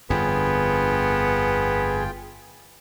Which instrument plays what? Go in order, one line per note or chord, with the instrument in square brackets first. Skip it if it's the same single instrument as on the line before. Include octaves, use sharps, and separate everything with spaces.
[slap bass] G1 F2 D3 [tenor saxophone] B3 [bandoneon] F4 G5 [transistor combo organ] G#4